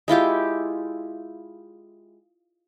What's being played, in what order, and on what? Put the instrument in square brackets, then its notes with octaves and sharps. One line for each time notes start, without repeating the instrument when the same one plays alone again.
[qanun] G#3 E4 F4 G4